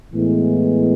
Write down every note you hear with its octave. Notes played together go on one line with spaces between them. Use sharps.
A2 E3 G#3 B3